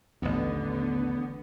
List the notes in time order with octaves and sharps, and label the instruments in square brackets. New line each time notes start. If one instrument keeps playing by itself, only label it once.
[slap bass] A1 D#2 [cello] D3 F#3 [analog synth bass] B3